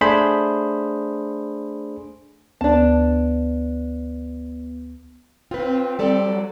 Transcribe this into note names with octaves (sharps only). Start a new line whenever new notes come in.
A3 D4 G#4 C5 B5
D2 B3 D4 A5
C4 F4 B4
G3 A4 D5
F#3